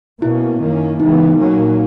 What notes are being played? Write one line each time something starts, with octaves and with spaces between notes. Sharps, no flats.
B2 A#3 C#4 E4
F#2 D#3 A#3 C#4
C#3 E3 G#3 B3 D#4
A#2 F#3 A#3 C#4